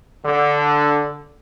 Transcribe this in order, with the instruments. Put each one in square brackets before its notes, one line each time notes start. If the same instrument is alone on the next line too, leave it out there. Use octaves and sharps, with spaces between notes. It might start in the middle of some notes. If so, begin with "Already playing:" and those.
[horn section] D3